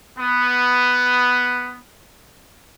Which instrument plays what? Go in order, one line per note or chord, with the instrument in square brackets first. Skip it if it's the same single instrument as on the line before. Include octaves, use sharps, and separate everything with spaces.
[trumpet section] B3